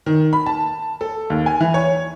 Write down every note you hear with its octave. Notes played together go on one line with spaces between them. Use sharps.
D#3
B5
A5
A4
D#2
G#5
E3
C#5